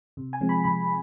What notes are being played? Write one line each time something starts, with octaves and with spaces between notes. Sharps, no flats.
C3
G#5
F3 G#3 C4
B5
C3 B5